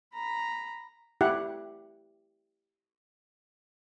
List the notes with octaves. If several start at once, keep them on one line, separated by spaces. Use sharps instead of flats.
A#5 B5
E4 G4 F#5